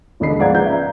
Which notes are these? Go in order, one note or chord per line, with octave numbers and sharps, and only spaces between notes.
E1 D#2 D3 D#5 B5 C7
G#2 F3 D5 F#5 A#5 G#6
C#3 B4 G6
E5 A#5